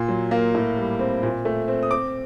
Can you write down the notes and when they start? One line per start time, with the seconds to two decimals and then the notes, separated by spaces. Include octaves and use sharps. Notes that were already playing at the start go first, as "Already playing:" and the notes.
Already playing: A#2 C6
0.08 F#3
0.31 A#3
0.55 A2
0.77 G3
0.99 C4
1.23 A#2
1.45 A3
1.68 C4
1.83 D#6
1.91 C4 D6